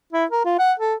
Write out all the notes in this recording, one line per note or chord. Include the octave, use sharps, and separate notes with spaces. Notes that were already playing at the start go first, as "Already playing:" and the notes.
E4
A#4
F4
F#5
A4